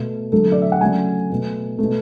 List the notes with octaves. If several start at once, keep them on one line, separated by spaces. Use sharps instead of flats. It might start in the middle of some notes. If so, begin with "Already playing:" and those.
Already playing: B2 A3
D3 F#3 A3 A4
D5
E5
F#5
C#3 F#3 A3 G#5
B2 A3
A3
B2